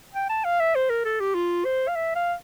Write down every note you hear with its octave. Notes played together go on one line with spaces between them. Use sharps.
G5
A5
F5
E5
C5
A#4
A4
G4
F4
C5
F5
E5
F5